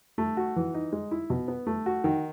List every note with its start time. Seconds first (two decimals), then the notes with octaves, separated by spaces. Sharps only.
0.18 A3
0.37 F#4
0.56 E3
0.74 D#4
0.92 G#3
1.11 E4
1.30 B2
1.48 B3
1.67 A3
1.86 F#4
2.04 D#3